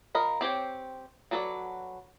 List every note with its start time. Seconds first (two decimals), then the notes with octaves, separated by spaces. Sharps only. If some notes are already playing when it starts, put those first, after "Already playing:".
0.15 F3 A#4 D#5 B5
0.41 C4 G4 C5 C#5
1.31 F#3 F#4 A4 B4 D5